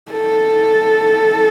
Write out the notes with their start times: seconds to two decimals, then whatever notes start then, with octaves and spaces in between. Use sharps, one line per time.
0.11 A4